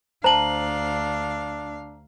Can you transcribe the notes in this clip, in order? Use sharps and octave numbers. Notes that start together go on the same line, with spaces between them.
D2 D4 C5 F5 A5 A#5 F#7